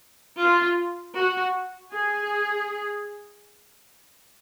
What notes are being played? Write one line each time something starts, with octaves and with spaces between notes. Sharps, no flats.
F4
F#4
G#4